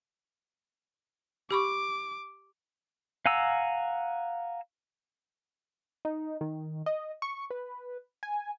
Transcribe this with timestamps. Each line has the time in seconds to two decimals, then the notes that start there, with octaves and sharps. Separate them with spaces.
1.51 G4 B5 C#6 D6
3.26 F5 F#5 G#5 A#5 E6
6.05 D#4
6.41 D#3
6.86 D#5
7.22 C#6
7.50 B4
8.23 G#5